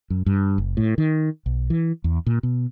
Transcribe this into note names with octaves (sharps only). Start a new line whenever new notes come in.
F#2
G2
F#1
A2
D#3
B1
E3
E2
A#2
B2